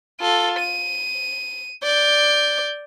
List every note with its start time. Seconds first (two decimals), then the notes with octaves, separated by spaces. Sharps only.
0.20 F4 A4
0.59 D#7
1.83 D5 G6